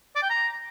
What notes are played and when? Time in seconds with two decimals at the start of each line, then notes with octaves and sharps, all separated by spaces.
0.16 D5
0.23 G5
0.30 A#5